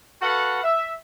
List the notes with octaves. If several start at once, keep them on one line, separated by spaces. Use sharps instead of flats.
F#4 A4 B4 F5 F#5
E5